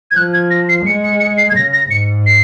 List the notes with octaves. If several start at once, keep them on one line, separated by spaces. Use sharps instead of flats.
G#6
F3 F#6
G#6
A#6
C7
G#3 C#7
C#7
C#7
C7
G#6
C#3 A#6
A#6
G#2 C#7
C7